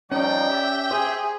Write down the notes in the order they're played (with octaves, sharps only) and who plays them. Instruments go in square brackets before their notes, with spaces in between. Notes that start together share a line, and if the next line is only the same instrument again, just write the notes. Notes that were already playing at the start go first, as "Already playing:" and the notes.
[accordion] F3 G3 D#4 [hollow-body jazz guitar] C#4 [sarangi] D5 [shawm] G5
[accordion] G4 E5
[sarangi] G#4 [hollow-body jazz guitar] C5